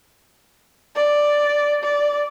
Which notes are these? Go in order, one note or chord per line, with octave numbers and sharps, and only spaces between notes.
D5
D5